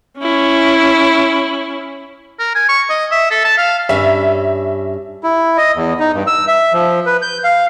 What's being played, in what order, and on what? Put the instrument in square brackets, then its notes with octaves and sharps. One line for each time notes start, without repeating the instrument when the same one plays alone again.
[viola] C#4 E4
[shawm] A#4
G#5
C#6
D#5
E5
A4
A5
F5
[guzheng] G2 C#4 [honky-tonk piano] E5
[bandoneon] E4
D#5
E2
D#4
G2
E6
E5
F3
B4
G6
F5